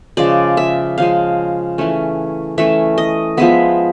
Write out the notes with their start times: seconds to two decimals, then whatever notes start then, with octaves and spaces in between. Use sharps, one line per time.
0.17 C#3 F3 G#3 D5
0.57 E5
0.98 C#3 F3 G#3 F5
1.78 E3 A3 C#4
2.58 E3 A3 C#4 E5
2.98 D#5
3.37 F3 G#3 B3 E5